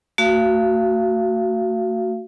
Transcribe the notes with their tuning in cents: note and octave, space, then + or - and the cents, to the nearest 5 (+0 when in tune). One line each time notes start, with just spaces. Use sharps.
A3 +35 F#4 +0 F5 -35